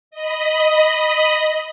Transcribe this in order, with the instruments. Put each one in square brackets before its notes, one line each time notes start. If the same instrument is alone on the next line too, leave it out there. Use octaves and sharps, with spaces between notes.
[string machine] D#5 B5